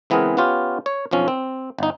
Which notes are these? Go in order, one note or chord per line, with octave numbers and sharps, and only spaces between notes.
C#2 E3 B3 C4 G#4 A#4
B3 C#4 F4 G4
C#5
B1 F2 F3 C#4
C4
G1 D#4